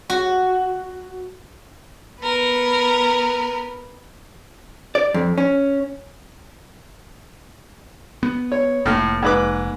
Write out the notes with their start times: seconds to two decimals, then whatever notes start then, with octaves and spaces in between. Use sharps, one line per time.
0.10 F#4
2.20 B3 A#4 B4
4.95 D5
5.14 F2
5.38 C#4
8.23 B3
8.52 C#5
8.86 F1 A2 A#3 F6
9.23 G#2 B4 D6